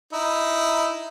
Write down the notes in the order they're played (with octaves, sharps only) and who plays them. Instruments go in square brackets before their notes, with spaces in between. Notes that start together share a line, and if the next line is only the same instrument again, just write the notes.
[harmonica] D#4 E4